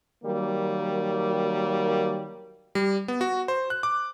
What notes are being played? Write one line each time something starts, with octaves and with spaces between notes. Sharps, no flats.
D#3 F#3 G3 A#3 A#4
G3
B3
F#4
C5
F#6
D6